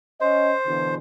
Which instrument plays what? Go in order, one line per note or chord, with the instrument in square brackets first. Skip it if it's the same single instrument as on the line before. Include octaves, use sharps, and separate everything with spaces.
[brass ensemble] C#4 D#5 [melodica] C5
[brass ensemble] B2 D3 E3